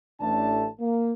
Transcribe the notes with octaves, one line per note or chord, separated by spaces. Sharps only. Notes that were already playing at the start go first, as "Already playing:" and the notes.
A1 A3 D4 A5
A#3